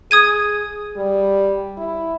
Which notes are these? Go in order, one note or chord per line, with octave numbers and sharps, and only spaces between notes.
G#4 D#6 G#6 D#7
G3
E4